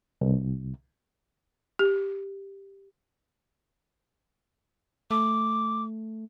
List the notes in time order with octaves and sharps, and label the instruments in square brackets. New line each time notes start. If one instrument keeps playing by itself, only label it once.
[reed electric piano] C2
[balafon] G4
[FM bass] A3 [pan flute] D6